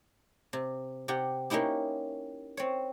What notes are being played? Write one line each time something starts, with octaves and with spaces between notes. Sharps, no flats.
C3
C3 G4 F#5
A#3 C#4 D#4 E4 G4
C4 C#5